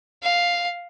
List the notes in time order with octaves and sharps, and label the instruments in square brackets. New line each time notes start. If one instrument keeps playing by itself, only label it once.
[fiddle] F5